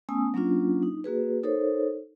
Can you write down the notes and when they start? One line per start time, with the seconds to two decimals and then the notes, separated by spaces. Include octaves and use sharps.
0.09 A3 B3 C#4 G#5 D#6 E6
0.34 F#3 A#3 C#4 D4 F4
0.83 D#4
1.04 A#3 F#4 G#4 B4
1.43 D#4 A4 A#4 C5 C#5